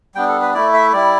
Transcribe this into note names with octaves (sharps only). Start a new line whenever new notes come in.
G3 B3 D4 G5
A4
B4
A3 E4 D5
E5
G3 E4 D5